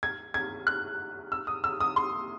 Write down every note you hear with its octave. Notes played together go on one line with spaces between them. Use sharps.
G#6
G#6
F#6
E6
D#6
E6
D#6
C6